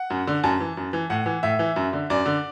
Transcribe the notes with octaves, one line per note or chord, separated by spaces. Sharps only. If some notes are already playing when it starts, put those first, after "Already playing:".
Already playing: F#5
F#2
D3
F#2 A5
E3
F#2
E3
A2 F#5
E3
A2 E5
E3
F#2
D3
F#2 D5
D3